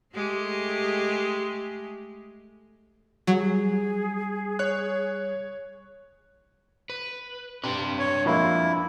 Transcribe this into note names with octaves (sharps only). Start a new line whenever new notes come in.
G#3 A3 G4
F#3 G3 G#4
C#5 F#6
B4
C3 D4 B4
C#5
F2 G#3 A#3 E4